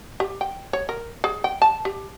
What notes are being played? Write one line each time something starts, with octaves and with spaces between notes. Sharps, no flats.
G4
G5
C#5
A#4
G#4
G5
A5
G4